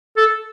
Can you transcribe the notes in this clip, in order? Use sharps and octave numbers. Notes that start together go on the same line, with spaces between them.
A4